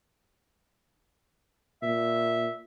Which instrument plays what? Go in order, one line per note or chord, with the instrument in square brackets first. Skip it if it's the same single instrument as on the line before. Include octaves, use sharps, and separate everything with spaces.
[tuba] A#2 [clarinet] E5